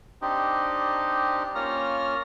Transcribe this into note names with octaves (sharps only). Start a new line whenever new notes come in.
C4 D4 D#4 G4 D#5
A#3 C#4 F4 C#5 A#5 F6